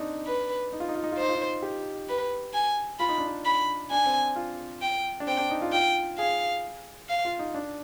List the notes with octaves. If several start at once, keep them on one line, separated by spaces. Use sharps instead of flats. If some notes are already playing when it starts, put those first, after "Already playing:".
Already playing: C4 D4 D#4
B4
D#4
F4
D#4
F4
D#4
F4
D#4 C5
F4
D#4
G4
B4
G#5
F4 B5
D#4
D4
D#4
B5
D4 G#5
C4
F4
G5
D4
C4 G5
D4
D#4
F4
F4 G5
G#4 F5
F5
F4
D#4
D4